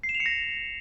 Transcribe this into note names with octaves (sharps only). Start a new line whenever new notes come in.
C7
E7
F7
C#7
A#6